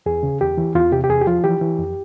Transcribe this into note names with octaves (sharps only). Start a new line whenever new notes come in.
E2 G#4
C#3
E2 G4
E3
E2 F4
C3 G4
G4
E2 G#4
G4
F3 F4
E3 G4
E3
F2